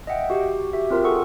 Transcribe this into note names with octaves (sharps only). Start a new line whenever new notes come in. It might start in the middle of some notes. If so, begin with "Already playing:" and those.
D#5 E5 F#5 G5
F#4 G4
F#4 G4 E5
C4 F4 A#4
G#4 A4 F#5 C#6